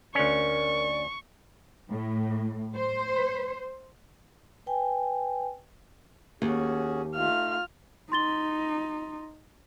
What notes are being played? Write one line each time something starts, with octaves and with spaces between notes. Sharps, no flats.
D2 C#4 A#4 D5 C#6
A2
C5
B4 G5 G#5
D#2 C#4 F#4 G#4
A3 D#4 F4 F6
D#4 C6 A6 G7